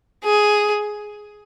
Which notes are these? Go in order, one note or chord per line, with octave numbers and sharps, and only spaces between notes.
G#4